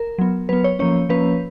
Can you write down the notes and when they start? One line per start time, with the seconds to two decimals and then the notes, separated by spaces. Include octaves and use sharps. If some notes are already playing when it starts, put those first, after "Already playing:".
Already playing: A#4
0.18 F#3 B3
0.49 F#3 B3 B4
0.64 C#5
0.79 F3 A#3 C#4 C#5
1.09 F3 A#3 C#4 B4